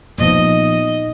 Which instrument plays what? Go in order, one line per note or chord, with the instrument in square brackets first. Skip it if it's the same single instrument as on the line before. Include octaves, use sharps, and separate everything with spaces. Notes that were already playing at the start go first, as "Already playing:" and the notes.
[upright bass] A#2 D#4 [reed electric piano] F3 B3 [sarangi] D#5